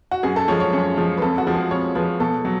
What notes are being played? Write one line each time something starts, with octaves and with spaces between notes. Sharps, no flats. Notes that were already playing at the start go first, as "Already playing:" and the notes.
F#4
F#2 G#4
A4
F3 G#3 C#5
C#5
F#2
F3 G#3
B4
F2 A4
F#4
F3 G#3
G#4
F2 C#5
F3 G#3 B4
B2 A4
F#3